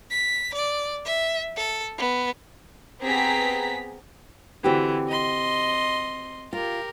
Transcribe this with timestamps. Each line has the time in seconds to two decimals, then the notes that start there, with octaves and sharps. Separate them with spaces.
0.11 B6
0.54 D5
1.06 E5
1.57 A4
1.98 B3
3.01 B3 C4 G4 G#4 A#5 B6
4.64 D3 E3 C4 F#4 G4
5.09 D#5 C6
6.53 F4 G4 A#4